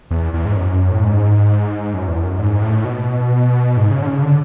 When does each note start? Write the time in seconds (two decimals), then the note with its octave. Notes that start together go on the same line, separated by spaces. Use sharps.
0.11 E2
0.34 E2
0.45 G#2
0.57 F#2
0.91 A2
1.02 G#2
1.94 F#2
2.08 E2
2.24 F#2
2.39 G#2
2.62 A2
2.85 B2
3.77 G#2
3.91 C#3
4.02 D3
4.07 C#3
4.23 D3